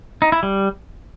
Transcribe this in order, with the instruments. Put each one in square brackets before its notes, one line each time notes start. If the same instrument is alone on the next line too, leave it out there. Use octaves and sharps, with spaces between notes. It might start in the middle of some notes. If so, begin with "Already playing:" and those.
[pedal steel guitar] D#4
E4
G3